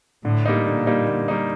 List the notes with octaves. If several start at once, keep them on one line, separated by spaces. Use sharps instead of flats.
A2 D3
G3 A#3 D#4
A#2 D3
G3 A#3 D#4
D3
G3 A#3 D#4